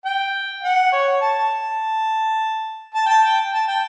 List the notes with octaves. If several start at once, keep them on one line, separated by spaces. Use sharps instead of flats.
G5
F#5
C#5
A5
A5
G5
A5
G5
A5
G5